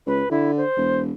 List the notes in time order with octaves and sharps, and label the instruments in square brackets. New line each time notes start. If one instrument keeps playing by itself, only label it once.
[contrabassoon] C#2 [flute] B4
[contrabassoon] D3 [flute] E4
[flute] C5
[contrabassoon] E1